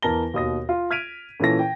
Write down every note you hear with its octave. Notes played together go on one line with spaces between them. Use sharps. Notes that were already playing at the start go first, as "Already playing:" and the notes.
E2 E3 A#4 A5 A#6 G7
D#2 B2 D#6 A#6
F4
F6 G#6 B6 D7 D#7 F7
A#2 E3 C#4 A4 A5 A#6
G5